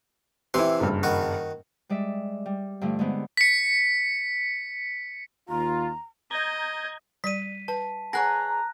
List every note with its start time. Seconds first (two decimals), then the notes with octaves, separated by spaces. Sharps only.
0.54 C3 E3 E4 G4 C6
0.80 F#1 G2
1.03 D#3 F#4
1.89 G3 G#3 D5 E5
2.46 G3
2.81 G2 D3 F3 A3
2.99 D3 G#3 B3 C4
3.37 B6 C#7
5.49 D#2 F4 A#5
6.31 D#5 A#5 G6 G#6
7.24 G3 D5 B6 D#7
7.68 B4 A5
8.13 G#4 B4 C#5 F#5 G#5 A#5 F#6 A#6